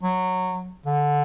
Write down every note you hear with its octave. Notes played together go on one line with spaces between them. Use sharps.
F#3
D3